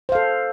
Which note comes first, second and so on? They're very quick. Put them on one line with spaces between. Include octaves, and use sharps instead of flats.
C5 F5 A4